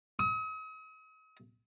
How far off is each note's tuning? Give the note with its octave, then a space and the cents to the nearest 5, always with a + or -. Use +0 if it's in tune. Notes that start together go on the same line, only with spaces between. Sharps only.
D#6 +40